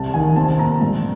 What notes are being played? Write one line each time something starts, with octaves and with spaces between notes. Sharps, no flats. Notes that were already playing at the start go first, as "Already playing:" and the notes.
Already playing: C2 C3 A5
D#3 G#5
C4 A5
A#2 A#5
G2